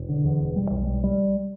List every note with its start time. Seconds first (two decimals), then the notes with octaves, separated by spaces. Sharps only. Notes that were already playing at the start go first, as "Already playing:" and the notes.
Already playing: E1
0.09 D3
0.25 E2
0.40 E1
0.56 G3
0.71 B1
0.87 G3
1.04 G3